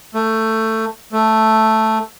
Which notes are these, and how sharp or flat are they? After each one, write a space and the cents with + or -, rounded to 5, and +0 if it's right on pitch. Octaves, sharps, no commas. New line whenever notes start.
A3 +15
A3 +0